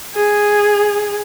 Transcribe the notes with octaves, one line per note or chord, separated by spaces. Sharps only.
G#4